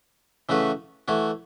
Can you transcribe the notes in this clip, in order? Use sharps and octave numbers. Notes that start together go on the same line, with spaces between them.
C#3 E3 A3 F#4 B4
E3 A3 F#4 C#5